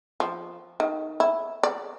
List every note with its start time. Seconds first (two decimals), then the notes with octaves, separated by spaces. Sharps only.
0.20 F3
0.80 D#3
1.20 E4
1.63 D5